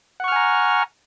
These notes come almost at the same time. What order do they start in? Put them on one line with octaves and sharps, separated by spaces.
F#5 C#6 F6 G#5 A#5